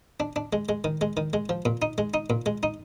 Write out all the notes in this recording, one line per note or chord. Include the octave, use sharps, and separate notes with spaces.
D4
D4
G#3
G#3
D#3
G#3
D#3
G#3
F3
A#2
D#4
G#3
D#4
A#2
G#3
D#4